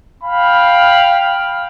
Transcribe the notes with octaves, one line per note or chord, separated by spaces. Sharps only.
F5 G5 B5